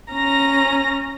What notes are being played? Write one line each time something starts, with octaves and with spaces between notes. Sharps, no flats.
C#4 A#5 A#6